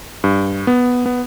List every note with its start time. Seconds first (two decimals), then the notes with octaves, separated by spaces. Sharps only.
0.24 G2
0.67 B3
1.06 B3